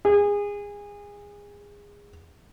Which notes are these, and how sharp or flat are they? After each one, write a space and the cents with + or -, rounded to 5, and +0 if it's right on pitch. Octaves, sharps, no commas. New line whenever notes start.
G#4 -25